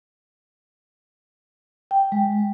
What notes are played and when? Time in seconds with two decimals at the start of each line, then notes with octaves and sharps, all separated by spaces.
1.91 G5
2.12 G#3